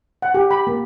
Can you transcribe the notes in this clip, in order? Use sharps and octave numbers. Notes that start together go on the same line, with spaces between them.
F#5
G4
B5
A#3